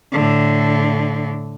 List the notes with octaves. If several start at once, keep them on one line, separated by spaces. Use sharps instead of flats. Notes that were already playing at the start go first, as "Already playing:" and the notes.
A2 D3